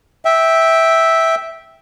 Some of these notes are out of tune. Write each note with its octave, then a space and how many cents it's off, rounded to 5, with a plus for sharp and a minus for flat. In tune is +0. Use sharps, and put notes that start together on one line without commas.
E5 -10 G5 +0